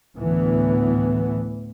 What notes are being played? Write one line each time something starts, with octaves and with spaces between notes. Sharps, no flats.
D2 A2 E3 B3